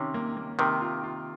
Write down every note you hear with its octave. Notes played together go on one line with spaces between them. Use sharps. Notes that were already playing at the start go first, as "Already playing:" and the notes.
Already playing: C3 D#3 C#4
A#3
A#3
C3 D#3 A#4
F4
F4